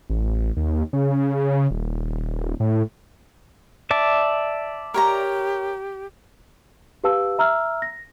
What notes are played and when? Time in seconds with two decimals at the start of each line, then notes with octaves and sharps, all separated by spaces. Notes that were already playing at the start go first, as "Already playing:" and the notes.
0.09 A1
0.57 D#2
0.93 C#3
1.71 D#1
2.60 A2
3.91 D5 E5 A5
4.94 G4 A#4 C#5 A#5
7.04 G4 B4 F5 A5 E6
7.38 E5 A#5 E6 F6
7.82 A#6